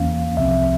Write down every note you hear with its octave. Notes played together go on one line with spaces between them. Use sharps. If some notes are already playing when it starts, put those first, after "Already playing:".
Already playing: E2 E3 A#3 C#4 F5
C2 C3 F3 C4 E5